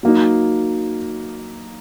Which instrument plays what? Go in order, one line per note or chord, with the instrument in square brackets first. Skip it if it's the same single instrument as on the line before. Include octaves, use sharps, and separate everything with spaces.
[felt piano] F#3 A#3 D#4